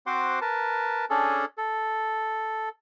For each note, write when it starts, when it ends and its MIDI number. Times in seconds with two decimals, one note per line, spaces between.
0.06 0.39 60
0.06 0.39 66
0.06 0.39 72
0.06 0.39 78
0.06 0.39 84
0.06 0.39 86
0.41 1.05 70
0.41 1.05 71
0.41 1.05 81
1.10 1.45 61
1.10 1.45 62
1.10 1.45 68
1.10 1.45 69
1.58 2.69 69